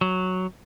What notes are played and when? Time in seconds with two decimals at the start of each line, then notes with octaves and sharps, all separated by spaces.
0.01 F#3